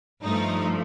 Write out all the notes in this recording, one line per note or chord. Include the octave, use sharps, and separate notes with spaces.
G2 F3 A3 D#4